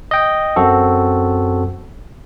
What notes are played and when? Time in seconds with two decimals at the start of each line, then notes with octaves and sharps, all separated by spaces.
0.11 D#5 G5
0.56 F#2 C4 F#4 A4